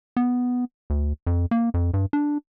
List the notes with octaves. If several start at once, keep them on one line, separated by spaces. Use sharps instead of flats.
B3
D2
F2
A#3
F2
G2
D4